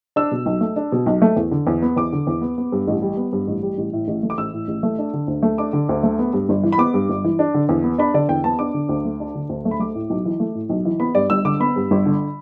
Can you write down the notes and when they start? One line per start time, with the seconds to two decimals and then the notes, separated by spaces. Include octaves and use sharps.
0.16 D4 E6
0.31 B2
0.46 B1
0.61 A3
0.76 D4
0.92 B2
1.06 B1
1.22 A3
1.36 E2
1.51 D3
1.67 E2
1.82 B3
1.96 E2 D6
2.13 D3
2.27 E2
2.41 B3
2.58 B3
2.72 G2
2.88 A1
3.02 G3
3.17 B3
3.33 G2
3.48 A1
3.63 G3
3.78 A1
3.93 A2
4.08 A1
4.23 A3
4.30 D6
4.38 A1 E6
4.53 A2
4.68 A1
4.83 A3
4.98 D4
5.13 D3
5.28 D2
5.43 A3
5.58 D4 D6
5.73 D3
5.89 D2
6.03 A3
6.19 B3
6.33 G2
6.49 G1
6.64 E3
6.72 B5
6.78 B3 D6
6.94 G2
7.09 G1
7.24 E3
7.39 D4
7.54 D3
7.69 E2
7.84 B3
7.99 D4 B5
8.14 D3 D5
8.29 E2 G5
8.44 B3 A5
8.59 D4 D6
8.74 D3
8.89 D2
9.05 A3
9.20 D4
9.35 D3
9.49 D2
9.65 A3
9.71 B5
9.80 A3 D6
9.95 A2
10.10 B1
10.25 E3
10.40 A3
10.55 A2
10.70 B1
10.85 E3
11.00 B3 B5
11.15 G2 D5
11.30 G1 E6
11.45 D3 D6
11.60 B3 B5
11.76 G2
11.91 G1
12.06 D3